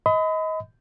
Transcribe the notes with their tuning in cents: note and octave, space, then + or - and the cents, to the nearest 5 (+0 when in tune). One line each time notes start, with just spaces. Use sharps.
D#5 +25 B5 +35